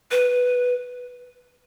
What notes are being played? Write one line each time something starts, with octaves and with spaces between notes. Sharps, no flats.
B4